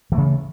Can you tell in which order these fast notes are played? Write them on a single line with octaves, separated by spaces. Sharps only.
E3 A3 C#3